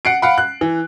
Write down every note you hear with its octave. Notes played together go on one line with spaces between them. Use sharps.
F#5 C7 D7
F5 F#5 B5
F#6
E3